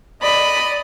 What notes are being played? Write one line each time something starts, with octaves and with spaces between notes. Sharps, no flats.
D5 D#5 B5